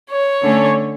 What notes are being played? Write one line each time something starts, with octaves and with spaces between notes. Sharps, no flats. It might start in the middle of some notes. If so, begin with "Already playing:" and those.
C#5
D3 A3 C#4